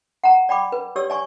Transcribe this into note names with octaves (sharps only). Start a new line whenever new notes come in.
F#5 A#5
D5 G5 B5 D6
B4
G4 C#5 D5 E6
D5 G#5 C#6